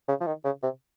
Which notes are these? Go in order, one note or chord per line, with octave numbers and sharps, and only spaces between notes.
C#3
F3
D#3
C#3
C3